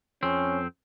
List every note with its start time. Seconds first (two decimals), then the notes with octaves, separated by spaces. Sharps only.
0.23 F2 C4 C#4